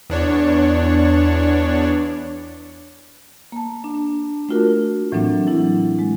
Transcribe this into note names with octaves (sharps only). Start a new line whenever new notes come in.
E2 D4 C#5
A#3 A5
D4
A3 D4 F4 F#4 A#4
A2 E3 F#3 A#3 C4 D4
F#3 E4
G#3